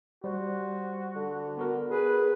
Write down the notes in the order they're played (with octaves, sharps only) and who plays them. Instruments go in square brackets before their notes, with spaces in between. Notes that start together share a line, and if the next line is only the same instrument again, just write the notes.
[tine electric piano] G3 [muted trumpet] F#4 [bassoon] C5
[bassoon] D3
[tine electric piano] B3 F#4 A#4
[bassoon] G#4 [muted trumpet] B4